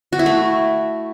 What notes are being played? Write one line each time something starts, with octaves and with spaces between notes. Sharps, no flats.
F#4
E4
A3